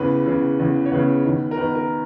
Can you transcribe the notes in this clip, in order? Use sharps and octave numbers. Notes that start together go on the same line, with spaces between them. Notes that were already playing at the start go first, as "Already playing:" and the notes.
Already playing: E2 C#3 E3 B4
E2 C#3 E3
E2 C#3 E3
C#5
E2 C#3 E3 B4
E2 D#3
A#4
E2 D#3 B4
A#4